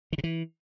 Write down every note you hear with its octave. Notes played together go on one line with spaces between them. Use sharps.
D#3
C3
E3